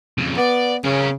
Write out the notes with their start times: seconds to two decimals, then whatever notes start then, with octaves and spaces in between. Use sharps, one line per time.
0.18 F2 C#3
0.38 B3 D5
0.85 C#3 C#4 A#4